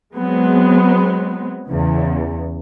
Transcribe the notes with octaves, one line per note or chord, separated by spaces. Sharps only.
F#3 G#3 B3 C4
E2 C#3